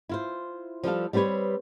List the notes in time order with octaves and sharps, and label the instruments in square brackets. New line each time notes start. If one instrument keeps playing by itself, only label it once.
[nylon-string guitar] E4 F4 C5
F3 G3 A4 F5
G3 C4 G4 B4 C#5